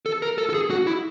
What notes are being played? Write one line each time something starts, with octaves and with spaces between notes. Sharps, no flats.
A4
A#4
A4
A4
G#4
F#4
E4